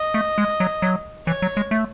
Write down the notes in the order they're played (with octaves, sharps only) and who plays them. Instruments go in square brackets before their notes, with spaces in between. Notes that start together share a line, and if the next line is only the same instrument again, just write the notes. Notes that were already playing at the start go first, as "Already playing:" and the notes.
Already playing: [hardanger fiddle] D#5
[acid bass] A3
G#3
F#3
F#3
[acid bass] E3 [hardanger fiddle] C#5
[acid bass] F#3
G#3
A3